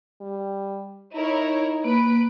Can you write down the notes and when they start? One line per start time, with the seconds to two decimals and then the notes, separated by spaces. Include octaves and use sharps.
0.21 G3
1.16 D#4 E4 A#4 C#5
1.84 A#3 B4 B5 D7